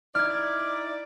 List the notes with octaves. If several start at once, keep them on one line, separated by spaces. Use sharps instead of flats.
D#4 E4 D5 F6 G#6